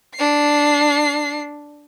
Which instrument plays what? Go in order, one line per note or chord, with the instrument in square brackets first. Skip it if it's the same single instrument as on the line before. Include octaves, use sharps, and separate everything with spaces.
[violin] D4 C7